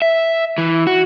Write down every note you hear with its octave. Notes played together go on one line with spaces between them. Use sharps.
E5
E3
F#4